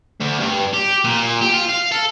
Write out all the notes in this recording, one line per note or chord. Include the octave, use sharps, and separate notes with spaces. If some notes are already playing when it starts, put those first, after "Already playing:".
D2
G2
G4
A#2
G4
F4
F5
A4